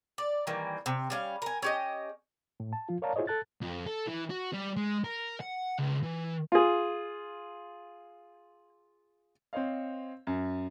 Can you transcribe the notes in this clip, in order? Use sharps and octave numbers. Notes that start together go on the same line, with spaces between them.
D5
D#3 E3 G3 A#3
C3
G3 C#4 F5
A#4 G#5
C#4 G4 D#5
A2
A5
F3 F4
A#4 C#5 D5 F5 A5 A#5
E4 F4 G#4 C5 C#5 D#5
A4 A5 F#6 A6
F2
A4
E3
F#4
G3
G#3
A#4
F#5
C#2
E3
F4 G#4
C4 C5 C#5 D#5 F5
F#2